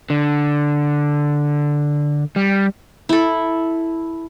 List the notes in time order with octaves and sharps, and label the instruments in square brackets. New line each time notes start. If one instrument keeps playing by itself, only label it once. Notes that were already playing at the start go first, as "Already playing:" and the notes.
[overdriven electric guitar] D3
G3
[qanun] E4 A4